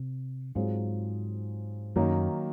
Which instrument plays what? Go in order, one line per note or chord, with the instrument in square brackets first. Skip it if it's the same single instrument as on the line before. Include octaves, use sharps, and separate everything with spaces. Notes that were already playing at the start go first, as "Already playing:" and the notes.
Already playing: [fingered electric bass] C3
[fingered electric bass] G#2 [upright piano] F#3 C4 F4 G#4
[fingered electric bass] F#2 [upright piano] D#3 F#3 A#3 D#4